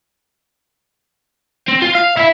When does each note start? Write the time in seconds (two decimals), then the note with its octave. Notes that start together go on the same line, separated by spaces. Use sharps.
1.68 C4
1.82 F4
1.95 F5
2.17 E4 E5